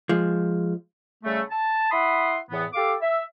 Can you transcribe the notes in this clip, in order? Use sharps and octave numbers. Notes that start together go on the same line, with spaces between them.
F3 G#3
C#3 G3 A3
A5
E4 F#5 B5 C6 D#6
E2 A2 E3 B3
G4 A4 F5 D6
E5